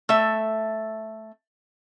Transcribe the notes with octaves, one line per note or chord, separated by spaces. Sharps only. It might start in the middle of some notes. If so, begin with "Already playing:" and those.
A3 E5